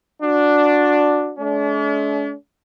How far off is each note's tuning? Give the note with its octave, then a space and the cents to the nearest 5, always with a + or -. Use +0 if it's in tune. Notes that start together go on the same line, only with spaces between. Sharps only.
D4 +0 F#4 -25
G#3 +45 D4 -45